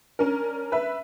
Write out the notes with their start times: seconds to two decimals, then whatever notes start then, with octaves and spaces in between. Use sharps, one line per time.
0.19 C#4 D4 A#4
0.72 B4 E5